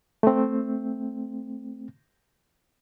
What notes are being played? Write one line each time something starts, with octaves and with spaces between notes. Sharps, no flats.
A3 C4